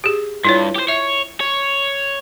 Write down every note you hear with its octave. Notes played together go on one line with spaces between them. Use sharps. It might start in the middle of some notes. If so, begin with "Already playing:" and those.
G4 G#4
G2 E4 F4 C#5
G4 C5
C#5 E5
C#5